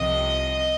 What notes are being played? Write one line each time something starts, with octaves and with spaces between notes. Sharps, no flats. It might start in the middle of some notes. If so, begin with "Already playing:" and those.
Already playing: C2 C3 F3 D#5